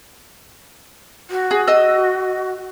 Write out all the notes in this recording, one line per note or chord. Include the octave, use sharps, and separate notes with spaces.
F#4
G#4
D#5 E6